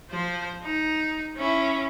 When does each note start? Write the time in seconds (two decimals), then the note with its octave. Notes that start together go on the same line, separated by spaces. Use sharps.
0.11 F3 C5
0.64 D#4
1.37 C#4 E4